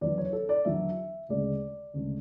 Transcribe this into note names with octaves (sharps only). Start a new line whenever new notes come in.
E2 D3 F#3 D5
C#5
A4
D5
E2 D3 F#3 E5
D2 C#3 G#3 D5
D2 C#3 G#3